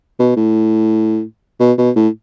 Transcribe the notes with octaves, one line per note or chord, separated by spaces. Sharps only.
B2
A2
B2
B2
A2